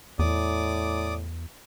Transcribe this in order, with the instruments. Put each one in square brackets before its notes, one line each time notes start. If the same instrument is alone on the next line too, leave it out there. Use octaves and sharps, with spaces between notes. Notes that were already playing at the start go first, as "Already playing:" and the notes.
[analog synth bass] E2 [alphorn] A2 [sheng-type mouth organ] D5 D6 D#6